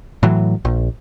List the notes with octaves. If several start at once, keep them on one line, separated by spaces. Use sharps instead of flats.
A2 E3 F#3
A#1